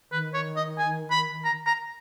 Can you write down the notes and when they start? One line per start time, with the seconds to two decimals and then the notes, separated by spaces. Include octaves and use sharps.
0.12 D#3 B4
0.34 C#5
0.56 D#5
0.79 G#5
1.11 B5
1.45 A#5
1.66 A#5